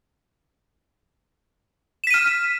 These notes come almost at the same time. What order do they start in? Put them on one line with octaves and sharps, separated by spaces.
E7 B6 D#7 F6